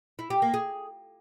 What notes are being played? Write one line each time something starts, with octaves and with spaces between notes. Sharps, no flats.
E4
G4
A#3
G#4